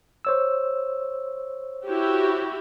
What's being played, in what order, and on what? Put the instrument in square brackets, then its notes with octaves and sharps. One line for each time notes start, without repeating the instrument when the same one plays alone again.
[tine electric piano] C5 C#5 E6
[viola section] E4 F#4 G4